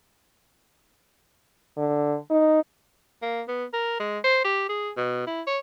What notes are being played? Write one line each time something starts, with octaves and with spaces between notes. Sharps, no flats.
D3
D#4
A#3
B3
A#4
G#3
C5
G4
G#4
B2
E4
C#5